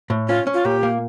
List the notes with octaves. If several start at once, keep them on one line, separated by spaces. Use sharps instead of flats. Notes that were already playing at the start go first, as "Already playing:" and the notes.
A2
C#4 F4
C#4
F4
A#2 G4
A#3